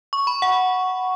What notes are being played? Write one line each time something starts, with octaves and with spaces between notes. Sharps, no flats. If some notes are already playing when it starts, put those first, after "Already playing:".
C#6
B5
F#5